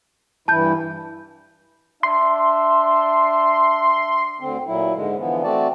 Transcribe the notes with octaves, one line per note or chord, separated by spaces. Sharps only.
G2 E3 E4 A5 G6
D4 E5 C6
D2 D3 C4
A#2 F#3 E4
G#2 D3 G#3
D3 E3 F3 B3
A3 C4 F#4 D5 A5